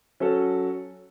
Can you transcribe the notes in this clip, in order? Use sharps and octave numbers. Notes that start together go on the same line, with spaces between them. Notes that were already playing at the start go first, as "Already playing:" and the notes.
F#3 C#4 F#4 A4